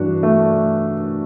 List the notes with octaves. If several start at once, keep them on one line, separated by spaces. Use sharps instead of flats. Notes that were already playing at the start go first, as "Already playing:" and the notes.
Already playing: G2 E3 D4 F#4
A3